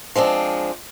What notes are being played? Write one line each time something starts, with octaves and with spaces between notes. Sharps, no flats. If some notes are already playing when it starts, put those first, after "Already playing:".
F3 G#3 C4 D4